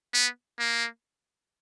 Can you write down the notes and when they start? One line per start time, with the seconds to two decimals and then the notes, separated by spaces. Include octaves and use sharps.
0.14 B3
0.59 A#3